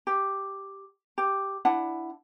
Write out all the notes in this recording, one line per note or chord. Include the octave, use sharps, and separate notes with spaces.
G4
G4
D4 E4 F#5